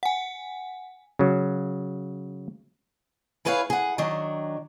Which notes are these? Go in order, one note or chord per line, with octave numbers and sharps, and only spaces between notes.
F#5 G#5
C#3 F#3
E4 G#4 B4 C#5 D5 F5
G#4 F#5
D#3 F#3 D4